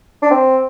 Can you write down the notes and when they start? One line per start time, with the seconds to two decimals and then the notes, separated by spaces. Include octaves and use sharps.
0.22 D4
0.31 C4